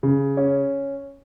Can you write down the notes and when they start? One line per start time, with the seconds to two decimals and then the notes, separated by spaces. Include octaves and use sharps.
0.03 C#3
0.37 C#4